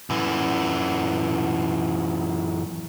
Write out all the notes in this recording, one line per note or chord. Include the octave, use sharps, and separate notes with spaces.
F#2 E3